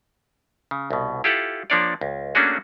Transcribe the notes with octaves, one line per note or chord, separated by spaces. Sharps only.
C#3
C2 B2
E4 F4 G4 A4 F5 F#5
F3 A#3 D4 C#5 D5
C#2
A3 A#3 C#4 D4 F#4 G#4